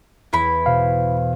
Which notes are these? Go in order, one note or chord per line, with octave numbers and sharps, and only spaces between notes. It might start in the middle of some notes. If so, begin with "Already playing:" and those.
E2 E4 B5
B2 C5 F5